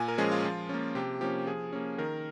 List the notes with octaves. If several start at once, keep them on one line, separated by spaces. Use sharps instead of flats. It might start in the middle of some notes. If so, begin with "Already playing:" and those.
Already playing: A#2 G#5
A#4
F3 G#3 C#4 G#4
F4
F3 F4
A#3 C#4
C3 G4
F3 A#3 C#4 G4
F3 G#4
A#3 C#4
D#3 A#4